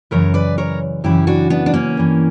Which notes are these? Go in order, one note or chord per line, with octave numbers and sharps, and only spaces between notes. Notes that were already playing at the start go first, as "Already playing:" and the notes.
F#2 C#3 E3 A#4 C#5
B4 D5
A#4 C#5
F#2 C#3 E3 E4 G4
D4 F#4
B3 D4
D4
A#3 C#4
G2 E3